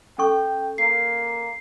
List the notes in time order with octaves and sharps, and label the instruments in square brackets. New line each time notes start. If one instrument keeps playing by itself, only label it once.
[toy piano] C#4 A4 C#6 [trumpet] G5
[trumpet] A#3 [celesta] C7